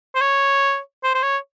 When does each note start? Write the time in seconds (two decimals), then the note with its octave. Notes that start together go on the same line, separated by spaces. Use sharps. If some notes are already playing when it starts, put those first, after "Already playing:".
0.15 C5
0.21 C#5
1.03 C5
1.14 C5
1.23 C#5